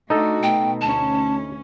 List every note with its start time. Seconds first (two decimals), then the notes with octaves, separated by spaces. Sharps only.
0.10 A3 D4 D#4 F#4 A4
0.43 B2 A3 G5
0.81 D2 C#4 A5